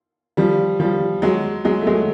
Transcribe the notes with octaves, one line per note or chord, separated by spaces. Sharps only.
F3 G3
F3 G3
F#3 G#3
F#3 G#3
A3
F#3 G#3